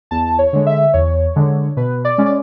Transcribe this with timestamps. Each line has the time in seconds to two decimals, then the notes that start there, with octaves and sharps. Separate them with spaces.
0.11 E2 A5
0.39 C#5
0.53 D3 G#3
0.66 E5
0.93 E2 C#5
1.36 D3 G#3
1.77 B2 B4
2.05 D5
2.18 G#3 C#4
2.26 D5